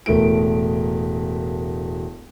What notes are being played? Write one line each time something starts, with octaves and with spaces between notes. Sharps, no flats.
E1 A2 A3 A#4 D7